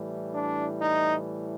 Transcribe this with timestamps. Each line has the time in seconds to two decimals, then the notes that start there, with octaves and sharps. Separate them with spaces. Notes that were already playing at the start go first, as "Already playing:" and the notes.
Already playing: A2 E3 G3
0.34 D4
0.81 D#4